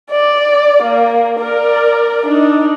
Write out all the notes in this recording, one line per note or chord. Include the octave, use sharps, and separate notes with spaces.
D5
A#3
A#4 D5
D4 D#4